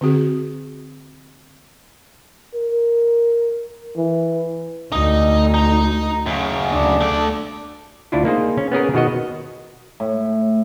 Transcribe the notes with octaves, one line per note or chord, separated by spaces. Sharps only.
D3 C4 F#4 G#4
A#4
E3
D2 D#4 D#5
D#4 A#5
F#2 C#3
D2 D4
A3 D5
D2 D4 E4 F4
A#3 D#4 G#4 C5
C#4
B3 C#4 G#4 A#4
B2 D#3 B3 F#4 D#5
A2